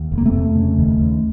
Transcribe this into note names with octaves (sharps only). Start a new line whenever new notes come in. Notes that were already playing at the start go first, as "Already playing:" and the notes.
Already playing: D#2
F1
A#3
A3 C4
F1
C#3
D#2
D#2